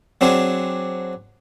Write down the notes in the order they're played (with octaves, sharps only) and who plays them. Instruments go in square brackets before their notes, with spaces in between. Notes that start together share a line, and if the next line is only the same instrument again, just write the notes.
[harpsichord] F#3 C4 D4 G#4